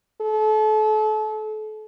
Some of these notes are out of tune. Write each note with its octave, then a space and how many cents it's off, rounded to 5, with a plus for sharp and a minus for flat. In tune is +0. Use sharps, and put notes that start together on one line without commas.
A4 -35